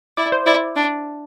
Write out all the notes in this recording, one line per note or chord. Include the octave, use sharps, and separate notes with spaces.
E4 D5
C5
E4 D5
D4